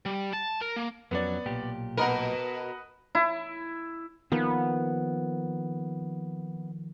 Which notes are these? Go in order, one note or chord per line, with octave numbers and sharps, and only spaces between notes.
G3
A5
A#4
A#3
F2 F#3 B3 C#4 D5
B1 A#2 G4
B2 A#4 B4 D#5 F#5
E4
D#3 F3 A#3 B3